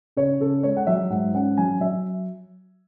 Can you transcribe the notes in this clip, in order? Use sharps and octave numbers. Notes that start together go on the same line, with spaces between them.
C#3 C#5
C#3 A4
G#3 C#5
F#5
F#3 E5
G#2 F#5
C#4 F#5
F#3 G#5
F#3 E5